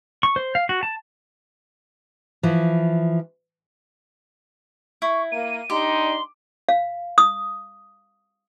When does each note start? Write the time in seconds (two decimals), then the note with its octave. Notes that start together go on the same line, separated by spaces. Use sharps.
0.23 C#6
0.36 C5
0.55 F5
0.69 F#4
0.83 A5
2.43 E3 F3
5.02 E4 C#6
5.31 A#3 D#7
5.70 G3 D4 D#4 G4 C6
6.69 F5
7.18 D#6